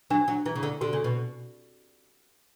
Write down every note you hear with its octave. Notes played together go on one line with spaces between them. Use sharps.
F#3 D4
F#3
E3 E4
C#3
D3
D3 F#4
C#3
B2